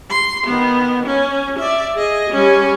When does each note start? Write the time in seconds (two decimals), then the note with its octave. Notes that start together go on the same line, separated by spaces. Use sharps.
0.10 C6
0.47 D#3 B3
1.06 C#4
1.59 D5 E5
1.96 G#4 D#5
2.30 G3 C#4